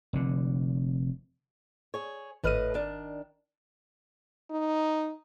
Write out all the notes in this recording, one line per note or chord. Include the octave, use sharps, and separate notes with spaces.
F1 D3
G#4 C#5
G#1 A2 B4 D#5 F6 D#7
D#3 D4
D#4